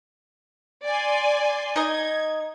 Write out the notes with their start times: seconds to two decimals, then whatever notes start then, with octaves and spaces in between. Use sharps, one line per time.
0.85 D5 G#5 C6
1.76 D#4 D#5 G#6